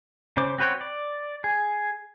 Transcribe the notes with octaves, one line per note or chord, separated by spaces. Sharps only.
C#3 C#4 C5 D6
C4 F#4 B4 C#5 G5
D5
G#4